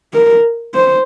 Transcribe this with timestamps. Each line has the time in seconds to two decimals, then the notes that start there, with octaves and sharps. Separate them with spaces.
0.14 A#4
0.74 C5